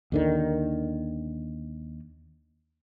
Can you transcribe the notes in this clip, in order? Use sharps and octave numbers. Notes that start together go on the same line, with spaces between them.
D#2 D3 D#3